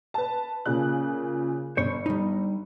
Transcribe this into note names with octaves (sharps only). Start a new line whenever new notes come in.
B4 A5
A#2 C#3 F#6
G1 C5 C#5
G3 D#4